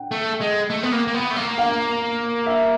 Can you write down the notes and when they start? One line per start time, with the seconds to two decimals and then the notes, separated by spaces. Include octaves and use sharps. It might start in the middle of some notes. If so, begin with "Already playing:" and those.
Already playing: F#5 G5
0.12 A3
0.41 G#3
0.70 A3
0.83 B3
0.92 A#3
1.07 A#3
1.14 B3
1.31 A3
1.36 A#3
1.58 F5
2.46 E5